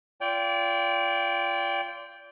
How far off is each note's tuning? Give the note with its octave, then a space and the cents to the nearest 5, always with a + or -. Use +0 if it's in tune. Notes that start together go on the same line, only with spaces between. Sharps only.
F4 -20 D5 -30 G5 +0